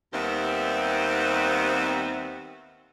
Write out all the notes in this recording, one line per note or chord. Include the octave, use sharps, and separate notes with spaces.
D#2 D#3 G3 B3 C4 E5